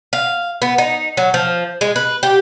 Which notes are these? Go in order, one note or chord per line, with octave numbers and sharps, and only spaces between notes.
F5
B3
D#4
F#3
F3
G#3
B4
G4